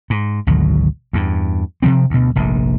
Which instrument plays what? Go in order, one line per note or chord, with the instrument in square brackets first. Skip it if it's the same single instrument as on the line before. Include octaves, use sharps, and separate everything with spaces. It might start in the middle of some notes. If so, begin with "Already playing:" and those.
[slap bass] G#2
G#1 D2 B2 F#3
E2 G2
C3 D#3 F3 C4
D2 B2
F1 A#1 G#2